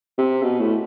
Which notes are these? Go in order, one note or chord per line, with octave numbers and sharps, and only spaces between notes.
C3
B2
A2